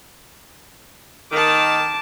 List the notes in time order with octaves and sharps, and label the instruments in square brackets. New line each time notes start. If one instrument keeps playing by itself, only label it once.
[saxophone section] D#3 [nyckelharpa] A5 D6